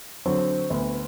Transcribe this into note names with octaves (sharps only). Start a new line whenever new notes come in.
D3 F#3 C4
D2 B3